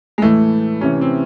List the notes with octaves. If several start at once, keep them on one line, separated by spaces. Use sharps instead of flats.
G#3
A2 E3 A3
C3 E3 C#4
C4